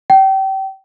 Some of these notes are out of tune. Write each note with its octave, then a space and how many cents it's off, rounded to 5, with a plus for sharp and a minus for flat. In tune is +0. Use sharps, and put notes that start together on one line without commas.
G5 -30